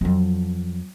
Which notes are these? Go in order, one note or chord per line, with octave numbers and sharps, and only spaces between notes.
F2 F#3